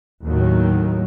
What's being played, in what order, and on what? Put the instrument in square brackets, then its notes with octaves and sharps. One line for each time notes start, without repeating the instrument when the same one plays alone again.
[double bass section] D#2 A2 D#3 F#3